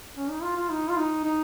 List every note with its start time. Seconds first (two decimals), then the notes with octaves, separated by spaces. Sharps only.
0.16 C#4
0.29 D#4
0.42 F4
0.57 F4
0.71 D#4
0.89 F4
0.97 D#4
1.24 D#4